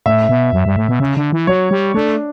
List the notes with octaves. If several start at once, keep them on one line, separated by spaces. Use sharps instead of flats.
A2 E5
B2
F#2
G2
A2
B2
C#3
D3
E3
F#3 C#5
G3
A3 D4